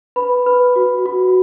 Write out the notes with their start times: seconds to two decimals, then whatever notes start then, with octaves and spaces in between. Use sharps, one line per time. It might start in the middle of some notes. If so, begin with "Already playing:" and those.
0.16 B4 B5
0.46 B4
0.76 F#4
1.06 F#4